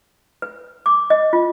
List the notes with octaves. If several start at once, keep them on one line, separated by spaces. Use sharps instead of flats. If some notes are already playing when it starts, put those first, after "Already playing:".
B4
D6
D#5
F4